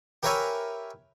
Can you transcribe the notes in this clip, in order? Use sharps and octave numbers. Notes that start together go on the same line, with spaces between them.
G4 A#4 B4 C#5 E5 G#5